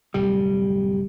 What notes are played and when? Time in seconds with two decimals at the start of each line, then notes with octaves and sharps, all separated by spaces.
0.14 D1 F2 C3 G3